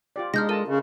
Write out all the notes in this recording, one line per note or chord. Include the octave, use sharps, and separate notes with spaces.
F4 G4 D5
G#3 D4 D#4 F6 G6 A#6
F4 A4 A#4 D#5 A5 D#7
C#3